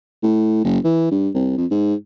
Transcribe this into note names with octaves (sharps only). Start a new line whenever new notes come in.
A2
F#1
E3
G2
C2
F2
G#2